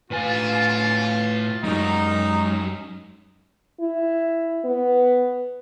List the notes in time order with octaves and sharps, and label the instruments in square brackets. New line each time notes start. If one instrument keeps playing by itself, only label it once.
[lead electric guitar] A2 G#5 [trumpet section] F4 [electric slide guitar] B4 F5
[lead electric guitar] F#2 [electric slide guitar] G#3 F#4 G4 [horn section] D#4
[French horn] E4
B3